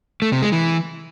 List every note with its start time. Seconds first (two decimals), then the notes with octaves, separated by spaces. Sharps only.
0.22 A3
0.32 C3
0.42 G#3
0.52 E3